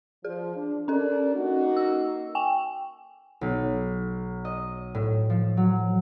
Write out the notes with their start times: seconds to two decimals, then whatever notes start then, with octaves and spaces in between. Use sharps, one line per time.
0.25 F3 G#4
0.56 D4
0.88 C#4 D4 A4 A#4
1.35 A#3 D#4 F#4
1.77 E6
2.35 G5 G#5
3.41 B1
4.45 D#5
4.95 A2
5.30 F3
5.57 F#3